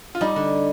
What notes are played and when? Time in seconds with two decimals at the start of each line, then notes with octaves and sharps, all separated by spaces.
0.15 F4
0.21 G3 D#4
0.36 D3